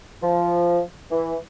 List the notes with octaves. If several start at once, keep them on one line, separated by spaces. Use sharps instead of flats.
F3
E3